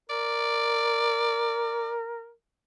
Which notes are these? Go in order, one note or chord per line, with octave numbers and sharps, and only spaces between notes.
A#4 D5